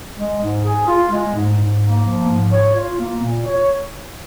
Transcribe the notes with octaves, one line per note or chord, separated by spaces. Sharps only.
G#3
G#2
G#4
F4
G#3
G#2
G#2
A#3
F3
G#2
C#5
F4
A#3
A#2
C#5